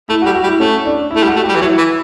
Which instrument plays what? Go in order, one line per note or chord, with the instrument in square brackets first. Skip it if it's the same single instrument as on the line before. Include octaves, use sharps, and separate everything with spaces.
[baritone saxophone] A3 [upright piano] E4
[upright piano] F#4
[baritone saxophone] G3
[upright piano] F#4
[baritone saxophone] G3
[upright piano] E4
[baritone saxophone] A3 [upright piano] C#4
[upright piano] D4
E4
[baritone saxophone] A3
G3
[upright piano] F#4
[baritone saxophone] A3
[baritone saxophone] G3 [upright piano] G4
[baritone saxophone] E3
[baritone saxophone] F#3 [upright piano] E4
[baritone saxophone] E3